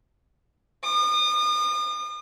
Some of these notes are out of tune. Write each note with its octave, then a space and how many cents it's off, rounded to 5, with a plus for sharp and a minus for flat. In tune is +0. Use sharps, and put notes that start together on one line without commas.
D#6 -40